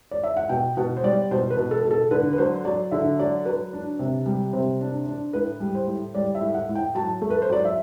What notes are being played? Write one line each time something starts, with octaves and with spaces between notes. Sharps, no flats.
D5
E5
F#5
B2 G5
B2 F#5
C5
G3 D5
B2 C5
B4
B2
A4
B2
A4
D3 B4
B4
F#3 C5
F#3 D5
D3 E5
F#3 D5
F#3 B4
D4
C3
G3
C3 C5
D4
D4
A2 B4
G3
C5
A2
G3 D5
E5
A2
F#5
A2
G5
F#3 A5
A3
B4
C5
F#3 D5
E5